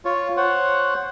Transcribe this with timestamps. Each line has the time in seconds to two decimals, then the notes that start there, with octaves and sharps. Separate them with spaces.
0.05 F4 C#5
0.37 C5 C#5 F#5